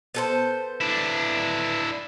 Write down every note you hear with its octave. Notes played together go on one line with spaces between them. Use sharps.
B3 A4 C5
D4 E4